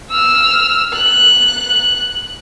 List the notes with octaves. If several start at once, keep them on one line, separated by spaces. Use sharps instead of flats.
E6 F6
F#6